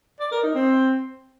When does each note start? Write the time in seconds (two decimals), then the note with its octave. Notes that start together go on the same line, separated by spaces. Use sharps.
0.20 D5
0.31 A#4
0.43 D#4
0.55 C4